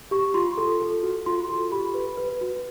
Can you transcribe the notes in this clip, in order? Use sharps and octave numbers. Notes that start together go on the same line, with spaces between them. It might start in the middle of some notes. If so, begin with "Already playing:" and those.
G4 C#6
F4 C6
A4
A4
F#4
F4 C6
A4
G4 B5
B4
B4
F#4